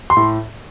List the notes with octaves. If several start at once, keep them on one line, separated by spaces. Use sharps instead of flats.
C6
A2